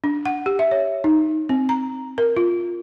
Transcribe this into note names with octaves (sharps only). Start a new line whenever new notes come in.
D4
F#5
G4
E5
C#5
D#4
C4
A#5
A#4
F4